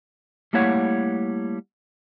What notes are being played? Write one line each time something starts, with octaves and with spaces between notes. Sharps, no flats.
G3 A3 A#3 E4 C#5 F#5